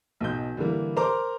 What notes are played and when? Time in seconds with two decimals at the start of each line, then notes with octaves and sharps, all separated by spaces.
0.21 B1 B2 G6
0.57 D3 E3 G3 A#3 E4
0.96 A#4 C5 A#5 C6 D6